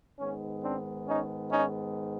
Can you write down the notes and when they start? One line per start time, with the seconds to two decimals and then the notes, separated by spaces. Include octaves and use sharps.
0.19 G#2 D#3 G#3 B3 C#4
0.64 C4 D4
1.07 C#4 D#4
1.52 C#4 D#4